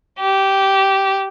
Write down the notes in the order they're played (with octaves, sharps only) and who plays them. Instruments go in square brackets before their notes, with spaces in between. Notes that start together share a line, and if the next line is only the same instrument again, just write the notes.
[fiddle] G4